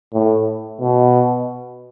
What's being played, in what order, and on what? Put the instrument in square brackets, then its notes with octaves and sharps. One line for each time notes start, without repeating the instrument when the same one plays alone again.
[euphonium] A2
B2